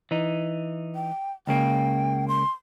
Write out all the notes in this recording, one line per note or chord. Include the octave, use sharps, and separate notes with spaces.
E3 D#4
G5
C#2 C#3 A#3 G5
C6